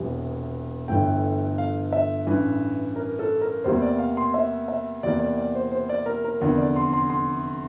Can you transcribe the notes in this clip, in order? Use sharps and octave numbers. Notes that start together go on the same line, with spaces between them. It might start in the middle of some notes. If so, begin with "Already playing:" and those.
Already playing: E1 E2 C3 E3 G3
G1 G2 E3 A3 G5
F5
E5
A1 G2 E3
A#4
A4
A#4
E2 C3 G3 A#3 C5
D5
F5
C6
E5
E5
E2 C3 E3 A#3 D5
D5
D5
C5
C5
D5
A#4
A#4
F1 E2 D3 A#4
D5
C6
C6
C6